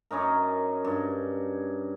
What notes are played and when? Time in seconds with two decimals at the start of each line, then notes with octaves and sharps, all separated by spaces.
0.11 F#2 C#4 D#4 A#4
0.85 G2